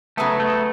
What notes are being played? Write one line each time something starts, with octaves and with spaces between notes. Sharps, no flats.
C#3 F#3 A3 B3
A3